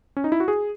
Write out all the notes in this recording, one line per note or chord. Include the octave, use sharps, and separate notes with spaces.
C#4
D#4
E4
F#4
G#4